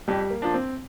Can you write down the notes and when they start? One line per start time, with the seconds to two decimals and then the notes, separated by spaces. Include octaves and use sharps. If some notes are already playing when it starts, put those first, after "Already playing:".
0.08 F2 G3 G4
0.30 A#3
0.42 F3 D4
0.54 C4